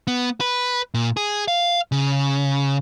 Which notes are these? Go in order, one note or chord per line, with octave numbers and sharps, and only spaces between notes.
B3
B4
A#2
G#4
F5
C#3